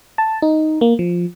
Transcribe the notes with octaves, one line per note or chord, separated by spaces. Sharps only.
A5
D#4
A#3
F3